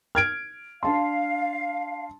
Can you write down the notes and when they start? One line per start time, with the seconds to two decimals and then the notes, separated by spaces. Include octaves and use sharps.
0.15 F6 G#6 D7
0.83 D4 F5 A5 C6